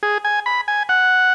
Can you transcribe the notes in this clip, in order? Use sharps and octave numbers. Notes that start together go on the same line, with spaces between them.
G#4
G#5
B5
G#5
F#5